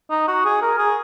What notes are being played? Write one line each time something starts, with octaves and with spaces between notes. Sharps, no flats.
D#4
F#4
G#4
A#4
G#4